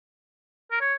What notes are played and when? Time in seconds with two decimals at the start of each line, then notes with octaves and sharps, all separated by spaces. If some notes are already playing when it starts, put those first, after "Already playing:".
0.71 A#4
0.80 C#5